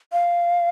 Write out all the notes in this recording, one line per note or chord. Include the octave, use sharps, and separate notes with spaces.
F5